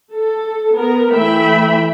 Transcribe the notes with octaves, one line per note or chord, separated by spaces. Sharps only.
A4
B3 A#4
E3 A3 E5 G5 B5